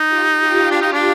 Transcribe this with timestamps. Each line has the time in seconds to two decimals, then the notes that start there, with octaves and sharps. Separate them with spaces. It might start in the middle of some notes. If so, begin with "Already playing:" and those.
Already playing: D#4
0.09 F4 G4
0.40 F4 G4
0.70 D4 F4 G4
0.81 D#4
0.93 D4